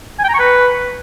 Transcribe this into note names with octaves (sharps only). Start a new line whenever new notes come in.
G#5
G5
A#5
C#6
B4